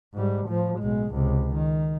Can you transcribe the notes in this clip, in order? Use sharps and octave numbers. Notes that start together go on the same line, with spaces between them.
G#2 G3
A2 F3
B1 G#3
C#2 C3
D#3